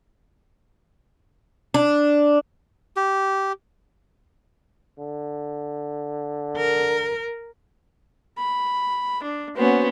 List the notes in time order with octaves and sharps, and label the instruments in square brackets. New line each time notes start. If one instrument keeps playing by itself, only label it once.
[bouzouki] D4
[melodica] G4
[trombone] D3
[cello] A#4
[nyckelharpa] B5
D4
[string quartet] A#3 B3 C#4 [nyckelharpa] F#4 C5